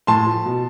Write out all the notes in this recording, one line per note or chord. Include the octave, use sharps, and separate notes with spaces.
A2 A5 C6
F3
B2